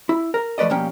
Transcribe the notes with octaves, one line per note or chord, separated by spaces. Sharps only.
E4
A#4
F3 A3 B4 D5 D#5
B2 F3 G3 A#3 C#4 G5